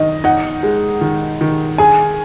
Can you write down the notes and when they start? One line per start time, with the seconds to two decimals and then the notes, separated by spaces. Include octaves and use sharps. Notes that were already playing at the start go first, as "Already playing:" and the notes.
Already playing: D#3 D#5
0.24 D#4 F#5
0.63 G#3
1.01 D#3
1.41 D#3
1.78 G#4 G#5